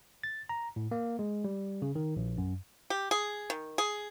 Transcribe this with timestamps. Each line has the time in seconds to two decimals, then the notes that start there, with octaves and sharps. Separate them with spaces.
0.23 A6
0.49 A#5
0.76 A2
0.91 A#3
1.19 G#3
1.44 G3
1.82 C#3
1.95 D#3
2.16 A#1
2.38 F#2
2.90 G4
3.11 G#4
3.50 D#3
3.78 G#4